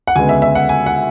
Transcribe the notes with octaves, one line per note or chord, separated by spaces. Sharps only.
F#5
D2 C#3 G#3 B3 G#5
E5
E5
F#5
G#5
F#5